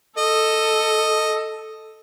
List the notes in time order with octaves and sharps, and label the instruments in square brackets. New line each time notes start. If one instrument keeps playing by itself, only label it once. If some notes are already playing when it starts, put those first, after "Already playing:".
[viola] A4 [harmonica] D#5